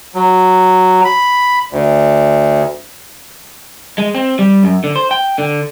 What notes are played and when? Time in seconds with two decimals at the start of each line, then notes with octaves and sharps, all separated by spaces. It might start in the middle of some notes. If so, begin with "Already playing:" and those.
0.15 F#3
1.05 B5
1.72 D2
3.98 G#3
4.15 C4
4.39 G3
4.63 F#2
4.84 D3
4.96 C5
5.11 G5
5.38 D3